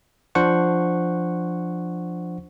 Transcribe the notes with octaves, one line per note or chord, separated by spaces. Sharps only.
F3 D4 C5 F#5 C#6